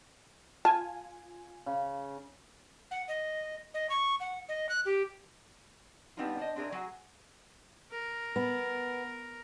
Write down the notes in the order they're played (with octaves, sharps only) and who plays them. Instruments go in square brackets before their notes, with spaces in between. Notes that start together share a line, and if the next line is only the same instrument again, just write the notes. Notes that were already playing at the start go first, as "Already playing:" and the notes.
[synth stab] F4 G#5 [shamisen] A5
[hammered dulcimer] C#3
[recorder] F#5
D#5
D#5
C#6
F#5
D#5
F#6
G4
[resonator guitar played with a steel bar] G3 B3 C4 D4 D#4 F4
D4 C5 D#5
C4 D4 G#4 A#4 E5
F#3 F#4 G#4 G#5
[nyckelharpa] A#4
[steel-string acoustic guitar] B3